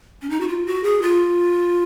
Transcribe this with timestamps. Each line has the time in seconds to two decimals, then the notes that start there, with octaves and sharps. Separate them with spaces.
0.22 C#4
0.30 D#4
0.41 F#4
0.48 F4
0.66 F#4
0.84 G#4
1.02 F4